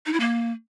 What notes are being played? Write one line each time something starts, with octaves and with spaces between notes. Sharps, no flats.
D#4
E4
A#3